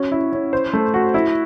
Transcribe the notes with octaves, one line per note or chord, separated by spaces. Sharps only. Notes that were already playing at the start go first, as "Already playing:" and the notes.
Already playing: C#4 F#4
E4
C#4
C5
A3
F#4
E4